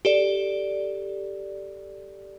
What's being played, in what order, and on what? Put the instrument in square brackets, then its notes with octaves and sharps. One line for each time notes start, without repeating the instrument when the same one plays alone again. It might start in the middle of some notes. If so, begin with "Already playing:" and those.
[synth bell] G4 A4 D5